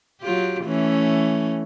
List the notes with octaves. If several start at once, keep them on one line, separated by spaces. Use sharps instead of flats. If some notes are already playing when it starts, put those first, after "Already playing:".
F#3 F4 G4
E3 A3 C#4